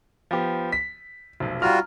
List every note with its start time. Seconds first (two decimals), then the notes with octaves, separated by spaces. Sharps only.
0.31 F3 B3 G4
0.72 B6
1.40 F1 B1
1.62 G3 F4 F#4 A#5 F6